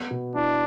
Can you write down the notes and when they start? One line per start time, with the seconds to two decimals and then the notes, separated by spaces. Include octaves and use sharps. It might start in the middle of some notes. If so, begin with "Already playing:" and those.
Already playing: B3
0.11 B2
0.35 D4 E4